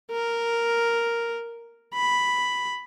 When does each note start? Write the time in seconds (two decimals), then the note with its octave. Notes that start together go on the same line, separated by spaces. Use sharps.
0.11 A#4
1.94 B5